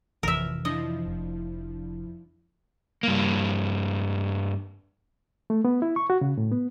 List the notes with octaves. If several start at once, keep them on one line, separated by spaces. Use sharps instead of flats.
A1 F2 C3 E3 F3 A#4 E5
F3 D4 E4 D#5
F1
G2 A#3
A3
B3
E4
C#6
F#4
C#3
A2
B3